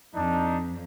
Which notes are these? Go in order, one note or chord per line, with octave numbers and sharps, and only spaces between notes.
F2 D4 D#4